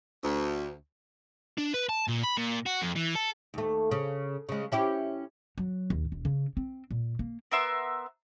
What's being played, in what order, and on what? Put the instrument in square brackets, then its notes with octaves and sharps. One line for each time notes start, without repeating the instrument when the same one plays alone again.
[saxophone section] D2
[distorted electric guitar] D4
B4
A5
A#2
B5
A#2
F#4
F2
E3
A4
[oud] D#2 A3
C#3
C#3 G#3
C#4 E4 G4
[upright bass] F#3
D#2
E1
C#3
C4
A#2
A#3
[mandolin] B3 A#4 E5 C6